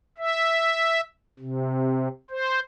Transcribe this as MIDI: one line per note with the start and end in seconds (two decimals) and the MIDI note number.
0.18 1.01 76
1.39 2.08 48
2.30 2.60 72